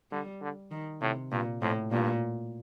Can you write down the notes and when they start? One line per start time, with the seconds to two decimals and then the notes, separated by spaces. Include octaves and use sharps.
0.11 D3 G3
0.41 D3
0.71 D#3
1.01 A2 C3
1.31 G2 A#2
1.62 F2 A2
1.91 G2 A#2